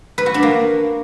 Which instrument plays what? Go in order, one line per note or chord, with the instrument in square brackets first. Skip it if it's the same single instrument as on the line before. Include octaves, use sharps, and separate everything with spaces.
[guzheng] B4
F#4
D4
A#3